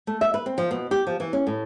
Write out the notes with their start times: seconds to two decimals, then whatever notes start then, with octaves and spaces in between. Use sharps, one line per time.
0.07 A3
0.21 E5
0.34 B4
0.46 C4
0.58 F3
0.71 B2
0.91 G4
1.07 F3
1.20 E3
1.33 C#4
1.47 A2